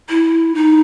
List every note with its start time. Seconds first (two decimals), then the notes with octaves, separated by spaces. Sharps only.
0.09 E4
0.54 D#4